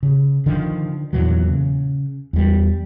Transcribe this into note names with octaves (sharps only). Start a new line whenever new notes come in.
C#3
D3 D#3 F3 D4
E2 A#2 E3 F#3
C#3
E2 G3